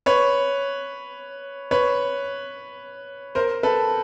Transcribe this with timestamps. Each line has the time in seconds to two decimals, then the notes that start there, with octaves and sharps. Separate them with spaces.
0.06 B4 C#5
1.71 B4 C#5
3.35 A#4 C5
3.63 A4 B4